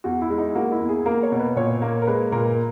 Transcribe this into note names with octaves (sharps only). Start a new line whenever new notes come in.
E2 F#4
E4
G#3
D#4
A#3 F#4
E4
E2
G#4
A#3 A#4
C#5
B2
B4
A#2 C#5
A#3
A#4
G#3 B4
A#2 A#4